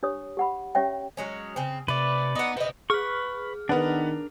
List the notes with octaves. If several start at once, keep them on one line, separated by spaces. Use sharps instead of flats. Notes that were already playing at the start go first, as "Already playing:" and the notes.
D4 G4 C#5 D#6
G4 F#5 B5
C#4 G4 C#5 E5 G5
F#3 G#3 C#4
C#3 C4
C3 A3 B4 D5
B3 D#4 F#5
B4 C5 D#5 E5
G#4 B4 C#6 F6
D#3 B3 D4 A#4 B4 F#5